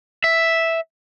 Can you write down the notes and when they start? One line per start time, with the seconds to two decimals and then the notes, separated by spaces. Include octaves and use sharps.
0.24 E5